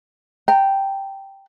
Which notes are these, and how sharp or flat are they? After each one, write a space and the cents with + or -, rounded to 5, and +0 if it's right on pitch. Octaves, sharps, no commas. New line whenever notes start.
G5 -5 A#5 -25